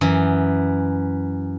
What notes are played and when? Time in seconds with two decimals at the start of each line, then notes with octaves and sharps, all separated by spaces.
0.01 F#2 E3